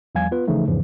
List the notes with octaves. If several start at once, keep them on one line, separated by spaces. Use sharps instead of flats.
E2 F3 G3 F5 G#5 G#6
B3 F4 B4
C#3 E3 F3 A3 D#4
E2 G#2 C#3 E3 F3